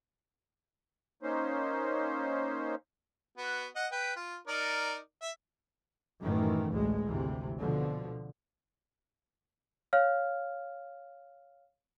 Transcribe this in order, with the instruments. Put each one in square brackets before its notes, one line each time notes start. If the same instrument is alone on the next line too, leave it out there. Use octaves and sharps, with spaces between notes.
[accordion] A#3 C#4 D#4 C5
[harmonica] B3 F#4
D#5 F#5
B4 G5
F4
D#4 A#4 D5
E5
[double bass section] F#2 A2 D#3 E3 A3
A1 D2 A2 G#3
G#1 D2 C3 E3
B2 D3 F3
[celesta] C#5 F5 F6